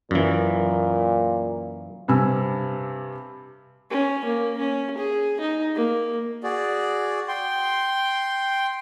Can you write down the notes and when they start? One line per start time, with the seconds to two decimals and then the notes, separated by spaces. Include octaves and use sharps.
0.11 F#2 A#2 E3
2.08 G2 C3 G#5 E6
3.90 C#4
4.25 A#3
4.58 C#4
4.97 G#4
5.40 D#4
5.75 A#3
6.43 F#4 G#4 D5
7.28 G5 C6